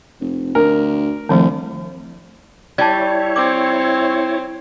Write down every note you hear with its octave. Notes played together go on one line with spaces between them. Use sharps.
F1
D2 A#4
C2 D#3 F3 A3
G3 E4 C#5 D5 A5
C4 D6